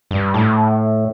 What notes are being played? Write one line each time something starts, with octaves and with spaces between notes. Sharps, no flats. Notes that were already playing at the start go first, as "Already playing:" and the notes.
G2
A2